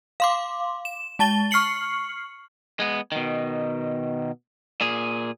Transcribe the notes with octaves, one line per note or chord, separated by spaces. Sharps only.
F5 C6 D6
E7
G#3 A5 A6 G7
C#6 F6 C7 C#7 F#7
G#3 B3
B2 D#3
A#2 G#4